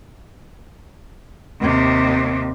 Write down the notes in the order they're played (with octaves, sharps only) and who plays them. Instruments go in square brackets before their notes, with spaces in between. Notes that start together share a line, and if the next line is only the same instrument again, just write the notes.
[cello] D#2 C3